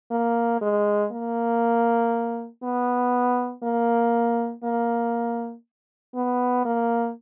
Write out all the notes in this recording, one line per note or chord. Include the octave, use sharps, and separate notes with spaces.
A#3
G#3
A#3
B3
A#3
A#3
B3
A#3